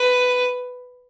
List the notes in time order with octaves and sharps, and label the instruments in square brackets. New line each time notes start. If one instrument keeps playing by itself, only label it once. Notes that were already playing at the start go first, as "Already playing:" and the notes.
Already playing: [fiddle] B4